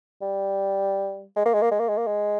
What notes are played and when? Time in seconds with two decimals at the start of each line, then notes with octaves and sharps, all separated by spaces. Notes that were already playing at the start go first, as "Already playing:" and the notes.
0.22 G3
1.36 G#3
1.45 A#3
1.54 G#3
1.62 A#3
1.71 G#3
1.80 A#3
1.88 G#3
1.98 A#3
2.07 G#3